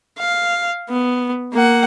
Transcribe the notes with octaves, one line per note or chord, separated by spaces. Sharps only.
F5
B3
A#3 F#5